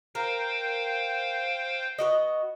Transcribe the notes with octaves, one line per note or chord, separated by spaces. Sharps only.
A#4 C5 F5 G5
B3 F#4 D#5